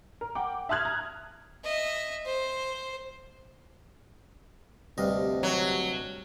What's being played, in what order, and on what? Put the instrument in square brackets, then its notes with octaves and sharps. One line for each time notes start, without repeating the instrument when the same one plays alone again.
[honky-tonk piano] A#4
F#5 G5 D6
E5 A5 D#6 F6 F#6 G#6
A#5
[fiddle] D#5 E5
C5
[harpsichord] D2 G2 D#5 [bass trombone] C3
[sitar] F#3